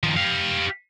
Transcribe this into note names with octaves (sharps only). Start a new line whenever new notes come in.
D#3 F3
G4 F5